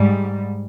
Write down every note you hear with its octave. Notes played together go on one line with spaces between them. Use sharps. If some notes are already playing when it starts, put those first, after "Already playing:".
Already playing: G#2 G3